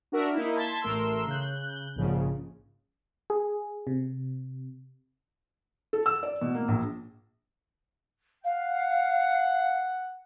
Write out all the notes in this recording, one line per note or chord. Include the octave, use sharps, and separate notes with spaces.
D4 F#4 A#4 E5
A#3 D#4 E4
A5 C6 G#6 A6 B6
A1 A3 A#4 C6 E6
C#3 F#6 G6
A#1 G#2 C#3 F3
G#4
C3
A4
E6
D5
B2
A#3
A#1
F5 F#5